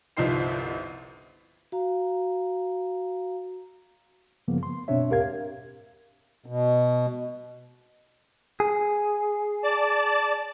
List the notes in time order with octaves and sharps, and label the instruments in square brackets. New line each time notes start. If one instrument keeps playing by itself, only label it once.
[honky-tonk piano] G1 C2 F3 D#4 C5 C7
[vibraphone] F#4 F5 A#5
[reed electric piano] G2 C#3 F3 A#3 B3
C6
F#2 B2 C4 D4 C#5 E5
D#2 G#2 G4 A#4 F5 G#6
[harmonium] B2
[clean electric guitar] G#4
[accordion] D5 A5